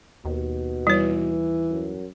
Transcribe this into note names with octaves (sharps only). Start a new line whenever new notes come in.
D#2 B2
E3 G3 C#5
F#2